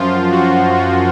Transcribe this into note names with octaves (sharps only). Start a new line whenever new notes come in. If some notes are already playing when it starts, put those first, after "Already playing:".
Already playing: F#2 F3 F4
F#4
F#4